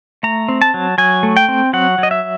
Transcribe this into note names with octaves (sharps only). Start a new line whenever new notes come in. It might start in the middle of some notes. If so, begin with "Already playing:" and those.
A3 A#5
C4
A5
F#3
F#3 G#5
A3
G5
C4
F#3 F#5
F#3 D#5
E5